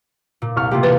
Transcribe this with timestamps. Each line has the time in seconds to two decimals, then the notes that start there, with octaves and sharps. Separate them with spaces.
0.42 A#2
0.56 C2 C#6 F6
0.71 C3 A3 A#3 F4 G4
0.83 E1 B4